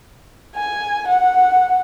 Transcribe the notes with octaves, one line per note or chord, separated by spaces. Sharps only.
G#5
F#5